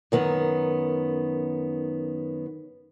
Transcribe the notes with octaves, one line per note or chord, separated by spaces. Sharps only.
F#2 D#3 B3